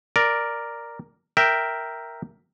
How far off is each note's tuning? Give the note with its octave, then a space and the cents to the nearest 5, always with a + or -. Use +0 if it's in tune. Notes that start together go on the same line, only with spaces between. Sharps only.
A#4 +0 D5 +0
A#4 +0 E5 +0 G5 +0